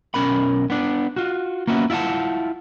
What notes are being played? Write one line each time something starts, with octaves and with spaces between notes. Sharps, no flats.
B1 C#4 A#4 B5
B3 D4
F4 F#4
A#3 B3 C#4 E4 F#4
E4 F4 E5 F#5 A5